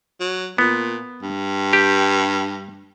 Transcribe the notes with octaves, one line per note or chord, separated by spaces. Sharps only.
F#3
A#2 B3
G2
G4